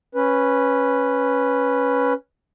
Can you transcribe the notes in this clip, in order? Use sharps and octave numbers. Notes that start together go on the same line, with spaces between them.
C#4 B4